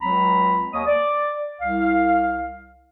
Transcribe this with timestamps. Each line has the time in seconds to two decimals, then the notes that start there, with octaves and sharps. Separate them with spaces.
0.02 C#2 F#3 C4 A#5 B5
0.73 D#2 A#3 C#5 D#5 D#6
0.86 D5
1.62 C2 F5